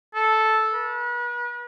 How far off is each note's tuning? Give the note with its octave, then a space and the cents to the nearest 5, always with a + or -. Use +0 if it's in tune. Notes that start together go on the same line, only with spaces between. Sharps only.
A4 -5
B4 -40